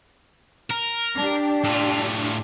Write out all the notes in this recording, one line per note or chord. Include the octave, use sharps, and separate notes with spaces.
A#4
D4 G4
A2 F4